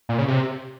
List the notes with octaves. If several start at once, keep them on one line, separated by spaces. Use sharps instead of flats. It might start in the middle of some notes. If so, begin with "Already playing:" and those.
A#2
C#3
C3